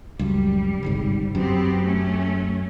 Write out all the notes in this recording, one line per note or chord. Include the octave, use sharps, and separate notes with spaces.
C#2 F#2 G3
G1 C2 G#2
F#2 B3 C4 G4
A3 C#4